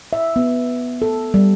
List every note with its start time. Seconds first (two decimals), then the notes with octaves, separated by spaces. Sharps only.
0.13 E5
0.36 B3
1.02 A4
1.34 G3